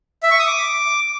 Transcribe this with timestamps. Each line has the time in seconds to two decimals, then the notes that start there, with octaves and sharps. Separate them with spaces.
0.23 E5
0.31 C#6
0.39 D#6
0.47 D6